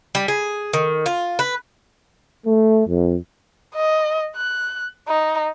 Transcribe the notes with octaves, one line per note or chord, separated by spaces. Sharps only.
G3
G#4
D#3
F4
B4
A3
F2
D#5
F#6
D#4